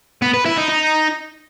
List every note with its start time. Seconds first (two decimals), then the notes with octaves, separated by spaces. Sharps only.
0.22 B3
0.34 B4
0.46 E4
0.57 D#4
0.69 D#4